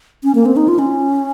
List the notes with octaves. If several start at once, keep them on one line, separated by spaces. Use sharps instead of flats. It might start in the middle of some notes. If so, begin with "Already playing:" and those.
C#4
A#3
C4
D#4
F4
C#4